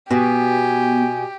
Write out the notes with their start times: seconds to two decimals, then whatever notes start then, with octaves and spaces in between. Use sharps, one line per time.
0.11 B2 B3 G4 G#5